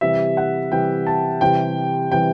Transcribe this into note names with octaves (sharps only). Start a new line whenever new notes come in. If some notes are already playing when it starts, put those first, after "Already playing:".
C3 E3 G3 E5
F#5
C3 E3 G3 G5
A5
C3 E3 G3 G5
C3 E3 G3 G5